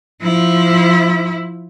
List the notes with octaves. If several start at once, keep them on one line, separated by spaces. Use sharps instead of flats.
F3 E4